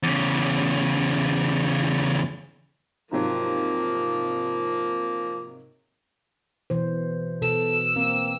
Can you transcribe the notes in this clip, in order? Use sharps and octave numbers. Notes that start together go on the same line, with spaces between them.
E2 C#3
G#2 C3 F3 F#3 A#3
B2 E3 C5
B2 A4 E6
A#3 C4